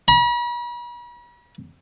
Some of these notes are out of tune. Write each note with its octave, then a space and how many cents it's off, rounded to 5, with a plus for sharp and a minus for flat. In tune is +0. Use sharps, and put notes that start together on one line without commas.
B5 -45